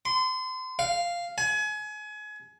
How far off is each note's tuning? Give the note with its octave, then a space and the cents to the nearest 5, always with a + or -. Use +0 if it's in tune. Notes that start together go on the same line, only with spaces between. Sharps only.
C6 -30
F5 -5
G#5 +30